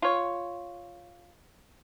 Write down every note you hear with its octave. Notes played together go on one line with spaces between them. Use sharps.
F4 C#5